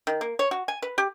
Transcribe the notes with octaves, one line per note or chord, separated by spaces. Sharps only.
D#3
A#3
C#5
F#4
G#5
B4
G4